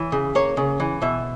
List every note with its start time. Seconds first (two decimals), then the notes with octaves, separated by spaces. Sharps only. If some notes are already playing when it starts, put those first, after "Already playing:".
Already playing: E3 C#5
0.12 C#3
0.35 A#3 C#5
0.57 C#3
0.80 E3
1.02 B2 E5